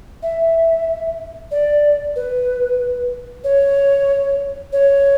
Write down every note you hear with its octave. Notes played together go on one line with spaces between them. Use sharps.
E5
D5
B4
C#5
C#5